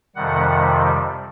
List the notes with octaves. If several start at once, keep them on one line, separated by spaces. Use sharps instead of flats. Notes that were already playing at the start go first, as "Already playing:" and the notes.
F2 C3 D#3 G3 F#5